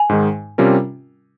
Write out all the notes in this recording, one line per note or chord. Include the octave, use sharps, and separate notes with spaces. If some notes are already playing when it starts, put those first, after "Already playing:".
Already playing: G#5
G#2 D#3 G#3
C3 G3 C#4 F4 A#4